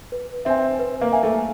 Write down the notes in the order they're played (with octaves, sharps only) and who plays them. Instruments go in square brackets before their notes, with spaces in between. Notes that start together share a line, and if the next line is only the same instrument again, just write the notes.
[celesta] B4
[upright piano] C4 [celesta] E5 G#5
[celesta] B4
[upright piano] A#3
[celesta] E5 G#5
[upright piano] A3